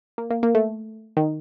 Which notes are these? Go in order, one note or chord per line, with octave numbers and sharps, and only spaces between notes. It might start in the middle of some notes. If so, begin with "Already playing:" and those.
A#3
A#3
A#3
A3
D#3